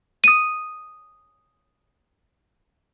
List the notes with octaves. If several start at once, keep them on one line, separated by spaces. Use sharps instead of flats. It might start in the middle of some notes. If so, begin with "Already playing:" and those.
D#6 D#7